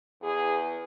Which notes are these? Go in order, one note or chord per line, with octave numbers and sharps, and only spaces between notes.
E2 G#4